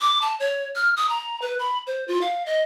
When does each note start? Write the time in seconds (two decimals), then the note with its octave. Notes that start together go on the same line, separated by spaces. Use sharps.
0.01 D6
0.22 A5
0.40 C#5
0.76 F6
0.97 D#6
1.09 A#5
1.42 B4
1.59 B5
1.87 C5
2.08 F4
2.21 F5
2.46 D#5